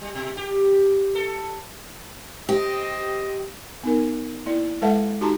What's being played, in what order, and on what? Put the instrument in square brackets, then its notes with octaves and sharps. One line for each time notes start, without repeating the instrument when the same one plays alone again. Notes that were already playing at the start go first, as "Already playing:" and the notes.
[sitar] G3
B2
G4
A4
[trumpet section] C4 D#5 [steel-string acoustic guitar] G4
[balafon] B3 D#4 A#4
A#3 E4 D5
G#3 A4 B4 E5 F#5 A5
D#4 F#4 G4 A5 A#5 C6